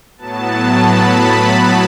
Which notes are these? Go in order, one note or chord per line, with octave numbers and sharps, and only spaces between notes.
A2 F#3 B3 A5
B5